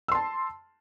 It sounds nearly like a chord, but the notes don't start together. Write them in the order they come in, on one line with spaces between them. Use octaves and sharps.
E6 C6 A5